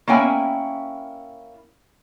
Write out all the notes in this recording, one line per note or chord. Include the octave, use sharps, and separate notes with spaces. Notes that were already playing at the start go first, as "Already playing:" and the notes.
A#3 C#4 E4 G5 G#5